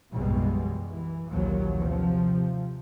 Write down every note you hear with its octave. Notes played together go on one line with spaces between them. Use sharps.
B1 F#2 B2 E3 G3 G#3
E3
A#1 D#2 F3 F#3
C3 F3